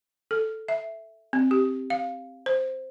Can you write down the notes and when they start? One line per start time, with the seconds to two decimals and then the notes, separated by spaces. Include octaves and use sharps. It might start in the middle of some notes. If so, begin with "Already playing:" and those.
0.31 A4
0.68 E5
1.33 C4
1.51 G4
1.90 F5
2.46 C5